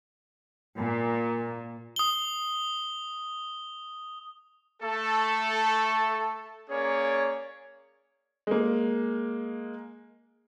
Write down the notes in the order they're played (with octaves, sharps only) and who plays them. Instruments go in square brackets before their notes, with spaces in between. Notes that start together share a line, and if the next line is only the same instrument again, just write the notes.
[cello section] A#2
[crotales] D#6 G7
[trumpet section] A3 A4
A#3 C#4 G#4 C#5 D5
[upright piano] G#3 A#3